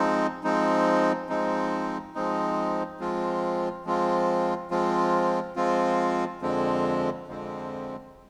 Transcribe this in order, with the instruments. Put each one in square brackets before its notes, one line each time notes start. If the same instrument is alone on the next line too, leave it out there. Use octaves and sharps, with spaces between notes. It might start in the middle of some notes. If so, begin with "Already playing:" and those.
Already playing: [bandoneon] F3 G#3 C4 D#4
F3 G#3 C4 D#4
F3 G#3 C4 D#4
F3 G#3 C4 D#4
F3 G#3 C4 F4
F3 G#3 C4 F4
F3 G#3 C4 F4
F3 G#3 C4 F4
F2 D3 F3 G#3 C4
F2 D3 F3 G#3 C4